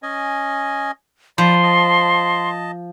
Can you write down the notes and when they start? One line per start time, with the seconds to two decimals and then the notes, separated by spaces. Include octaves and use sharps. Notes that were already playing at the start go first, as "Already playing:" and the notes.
0.03 C#4 D#5 G#5
1.38 F3 D5 B5 C6
1.63 D#5 A5